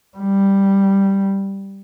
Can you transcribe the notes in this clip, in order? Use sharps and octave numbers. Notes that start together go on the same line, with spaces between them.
G3